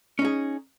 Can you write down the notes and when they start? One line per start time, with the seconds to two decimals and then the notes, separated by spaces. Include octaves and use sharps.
0.19 C#4
0.22 D#4
0.25 G#4